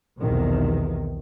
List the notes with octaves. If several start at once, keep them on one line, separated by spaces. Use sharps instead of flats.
B1 E2 C3 D#3